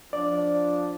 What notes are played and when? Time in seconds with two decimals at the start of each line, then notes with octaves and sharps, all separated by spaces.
0.13 F3 D4 D5